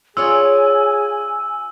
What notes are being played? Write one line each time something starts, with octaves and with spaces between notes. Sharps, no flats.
F4 G#4 C#5 D5 G#5 E6